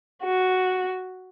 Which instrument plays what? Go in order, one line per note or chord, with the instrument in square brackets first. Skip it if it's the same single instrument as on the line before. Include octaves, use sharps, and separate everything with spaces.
[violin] F#4